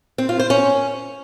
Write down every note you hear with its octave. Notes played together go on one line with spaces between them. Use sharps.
C4
F4
C5
C#4